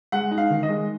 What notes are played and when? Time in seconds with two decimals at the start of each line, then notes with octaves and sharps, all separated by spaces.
0.12 G#3 F#5
0.31 D#4
0.38 F5
0.50 D#3
0.63 D#5
0.69 G#3